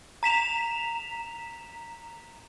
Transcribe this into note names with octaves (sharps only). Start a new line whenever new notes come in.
A#5 B6 E7 F7